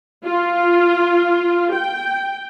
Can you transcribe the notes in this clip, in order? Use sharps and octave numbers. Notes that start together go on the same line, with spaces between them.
F4
G5